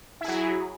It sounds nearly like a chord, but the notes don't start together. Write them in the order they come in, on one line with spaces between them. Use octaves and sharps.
E4 G#4 F#3